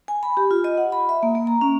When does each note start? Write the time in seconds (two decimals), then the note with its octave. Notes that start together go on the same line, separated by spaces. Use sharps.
0.08 G#5
0.23 B5
0.37 G4
0.51 F4
0.64 D#5
0.78 F#5
0.92 B5
1.09 E5
1.23 A#3
1.35 A#3
1.47 A#5
1.61 C#4